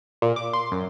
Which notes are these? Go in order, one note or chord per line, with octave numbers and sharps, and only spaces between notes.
A#2
D6
C6
F#2